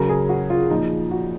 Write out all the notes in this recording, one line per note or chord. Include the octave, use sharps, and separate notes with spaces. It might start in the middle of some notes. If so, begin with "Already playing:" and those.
Already playing: C#3 F#3 A#4
G#4
F#4
F4
A#2 F3 D#4
F#4